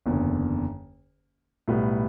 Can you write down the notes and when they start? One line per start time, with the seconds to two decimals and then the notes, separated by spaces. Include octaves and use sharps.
0.06 F#1 E2 D3
1.68 B1 A2 G3 B3